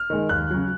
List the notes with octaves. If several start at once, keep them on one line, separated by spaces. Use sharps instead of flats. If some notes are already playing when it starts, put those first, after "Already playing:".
Already playing: F6
D#3 G#3
D#2 F#6
C#3 F#3